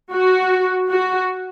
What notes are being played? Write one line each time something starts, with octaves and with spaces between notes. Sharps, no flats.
F#4
F#4